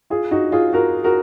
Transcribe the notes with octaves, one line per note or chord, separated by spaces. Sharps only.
F4 G#4
D#4 F#4
F4 G#4
F#4 A#4
F#4 A#4